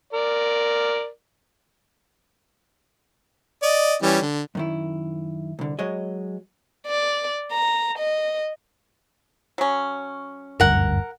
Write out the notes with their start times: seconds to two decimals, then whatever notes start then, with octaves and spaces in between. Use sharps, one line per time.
0.13 A#4 D5
3.62 D5 D#5
4.02 E3 G3 C#4
4.21 D3
4.55 F#2 D#3 E4
5.59 C2 D3
5.79 F#3 G#3 C#5 D#5
6.87 D5
7.52 A#5
7.98 D#5
9.58 F#3 C#4
10.60 F#1 D2 G2 A#4 F#5